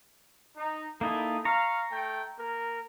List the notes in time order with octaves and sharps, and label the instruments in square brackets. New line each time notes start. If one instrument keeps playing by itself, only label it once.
[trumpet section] D#4
[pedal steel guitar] A#3 D#4 E4 [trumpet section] A4 D#6
[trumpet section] F5 [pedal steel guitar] A#5 C#6
[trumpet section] A3 G5
A#3 A#4